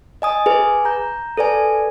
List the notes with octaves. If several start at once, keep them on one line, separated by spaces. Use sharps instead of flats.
D#5 G#5 D#6
G#4 B4 G#5
A#5 G6
A4 B4 D5 G#5